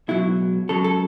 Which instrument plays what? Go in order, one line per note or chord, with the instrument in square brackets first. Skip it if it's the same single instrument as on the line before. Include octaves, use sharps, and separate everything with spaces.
[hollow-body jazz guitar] C#2 B2 F#3 E4
C#2 C#3 F#3 A4
A4